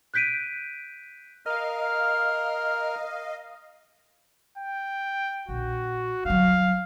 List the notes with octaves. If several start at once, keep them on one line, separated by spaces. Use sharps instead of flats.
F#6 G6 B6 D7 D#7
A#4 D#5 F5 F6
G5
A#1 F#4
F#3 G3 F5